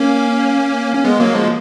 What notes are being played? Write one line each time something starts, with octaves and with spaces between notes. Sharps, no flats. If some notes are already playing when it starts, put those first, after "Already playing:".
Already playing: A#3 C#4
C#4
G#3 B3
F#3 A#3
F3 G#3